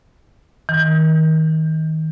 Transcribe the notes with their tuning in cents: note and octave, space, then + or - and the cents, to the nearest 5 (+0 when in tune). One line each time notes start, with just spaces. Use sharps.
D#3 +25